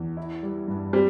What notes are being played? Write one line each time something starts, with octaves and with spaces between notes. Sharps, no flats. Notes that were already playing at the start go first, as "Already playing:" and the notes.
Already playing: E2
E4
G3
G2
G3 C4